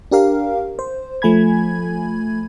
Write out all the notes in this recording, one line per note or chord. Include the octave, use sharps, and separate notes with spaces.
D4 G4 A#4 F5
C5
F3 A3 G#5 B5 G#6